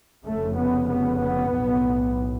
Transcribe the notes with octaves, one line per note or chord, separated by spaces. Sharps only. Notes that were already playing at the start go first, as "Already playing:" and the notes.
F1 F2 C#3 A3
B3
B3
B3
B1 A2